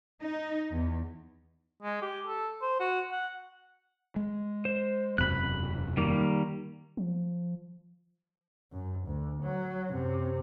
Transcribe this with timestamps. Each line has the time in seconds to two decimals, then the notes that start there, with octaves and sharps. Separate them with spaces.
0.21 D#4
0.72 E2
1.82 G#3
2.02 G4
2.26 A4
2.62 C5
2.80 F#4
3.12 F#5
4.16 G#3
4.65 C5
5.18 E1 F#2 C3 B5 F#6
5.97 D#3 G3 A#3
6.97 F3
8.72 F#2
9.07 D2
9.43 F#3
9.91 F#2 C3